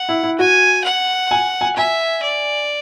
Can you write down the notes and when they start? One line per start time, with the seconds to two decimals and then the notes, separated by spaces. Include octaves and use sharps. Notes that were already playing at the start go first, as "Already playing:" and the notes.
Already playing: F#5
0.09 E4
0.23 E4
0.39 F#4 G#5
0.85 F#5
1.31 G#5
1.61 G#5
1.76 E5 G#5
2.23 D5